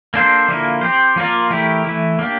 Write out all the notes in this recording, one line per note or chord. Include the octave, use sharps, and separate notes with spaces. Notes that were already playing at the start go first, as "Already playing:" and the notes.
A#3 D4 A4 C5
D3 F3 A#3 E4 A#4
C4 G4 C5
F3 A#3 F4 A#4 D5
E3 A3 E4 G4 A#4
E3 A3 E4
A#3 D4 G4